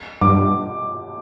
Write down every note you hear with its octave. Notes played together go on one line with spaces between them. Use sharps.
G2 D6